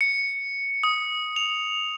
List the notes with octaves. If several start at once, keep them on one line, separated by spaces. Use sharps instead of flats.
C#7
D#6
F7